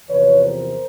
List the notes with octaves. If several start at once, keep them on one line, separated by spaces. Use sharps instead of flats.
E2 C3 F3 B4 C#5
A#4 C5